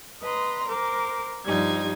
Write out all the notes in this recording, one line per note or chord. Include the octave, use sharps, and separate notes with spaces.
B4 D#5 A#5 C6
A#4 C5 D6
G2 F3 G3 D#4 G#6